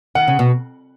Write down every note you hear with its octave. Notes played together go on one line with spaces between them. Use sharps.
D#3 F#5
C#3
B2